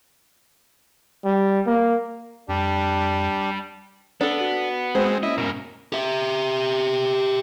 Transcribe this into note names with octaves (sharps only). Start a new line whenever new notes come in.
G3
A#3
F2 G3 D4 G4
B3 D4 A4
F#4
G#3 C4 F#4 C5 E6
A#3 C#4 E4 D#5
G#2 B2 A#4
G4 E5